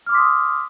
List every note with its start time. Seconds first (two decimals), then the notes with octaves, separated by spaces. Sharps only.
0.06 F6
0.09 D6
0.12 C6
0.15 B6
0.17 D#6